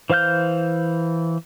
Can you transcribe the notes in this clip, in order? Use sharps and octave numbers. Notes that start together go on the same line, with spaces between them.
E3 C5 F5 F6 G6